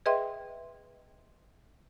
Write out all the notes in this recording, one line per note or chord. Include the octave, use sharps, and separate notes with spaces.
G#4 B4 D#5 E5 G5 C6